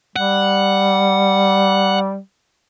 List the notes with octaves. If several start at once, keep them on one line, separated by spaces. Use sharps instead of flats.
G3 F#5